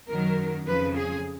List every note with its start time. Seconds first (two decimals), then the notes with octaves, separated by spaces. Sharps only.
0.09 F#2 D#3 F#3 A#4
0.67 F2 C#3 F3 B4
0.96 G#4